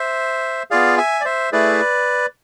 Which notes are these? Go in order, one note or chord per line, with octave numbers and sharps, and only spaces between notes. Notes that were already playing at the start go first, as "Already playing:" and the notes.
Already playing: C5 E5
B3 F4 G#4 D5 F5
E5 G#5
D5
C5 E5
A3 E4 G#4 B4 D5